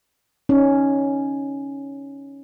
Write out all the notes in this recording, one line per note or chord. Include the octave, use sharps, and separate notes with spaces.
C#4 D#4